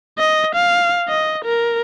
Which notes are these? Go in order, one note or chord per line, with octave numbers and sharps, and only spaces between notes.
D#5
F5
D#5
A#4